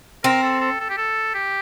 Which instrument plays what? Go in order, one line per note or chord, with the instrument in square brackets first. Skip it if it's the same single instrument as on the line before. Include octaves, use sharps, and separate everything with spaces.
[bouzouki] C4 [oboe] A#4
[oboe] A4
A4
A4
G4
A4
G4